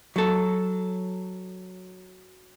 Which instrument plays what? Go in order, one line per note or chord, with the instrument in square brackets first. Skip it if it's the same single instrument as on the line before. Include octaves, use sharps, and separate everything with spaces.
[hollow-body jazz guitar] F#3 A4